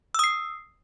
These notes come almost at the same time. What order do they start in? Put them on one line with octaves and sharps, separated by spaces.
E6 D#6 C7